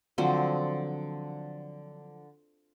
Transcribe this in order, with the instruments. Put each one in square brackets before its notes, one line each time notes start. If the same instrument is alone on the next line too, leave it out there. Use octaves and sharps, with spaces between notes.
[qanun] D3 F3 F#3 C4